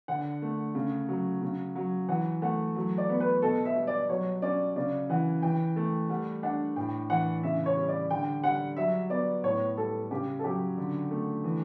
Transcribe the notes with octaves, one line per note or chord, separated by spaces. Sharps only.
D3 F#5
A3
C#3
F#3
C#3
F#3
E3 F#5
A3 F#5
F#3
D5
B3
B4
B2 A4
E5
G3
D5
F#3 C#5
C#4 D5
C#3 D5
E3 F#5
E3 G5
A3
G3 F#5
D4 F#5
A2 G5
E3 F#5
C#3 E5
C#5
G3
D5
D3 G5
G3 F#5
F#3 E5
B3 D5
A2 C#5
G3 A4
C#3 G4
A4
F#3 G4
D3
A3
E3